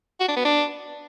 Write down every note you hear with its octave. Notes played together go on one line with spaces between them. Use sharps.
F#4
D4
B3
D4